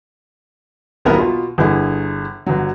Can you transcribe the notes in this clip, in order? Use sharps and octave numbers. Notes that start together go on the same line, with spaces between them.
D#1 B1 B3 E4 A#4
B2 F4
G1 D3 E4 G#4
G1 F#3